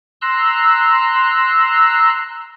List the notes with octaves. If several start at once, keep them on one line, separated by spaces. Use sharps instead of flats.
A#5 C6 E6 F#6